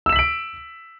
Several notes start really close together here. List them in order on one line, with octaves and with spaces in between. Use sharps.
E6 E7 B6 F#7 D7